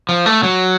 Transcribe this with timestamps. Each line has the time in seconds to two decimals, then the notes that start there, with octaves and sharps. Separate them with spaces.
0.09 F3
0.26 A3
0.43 F#3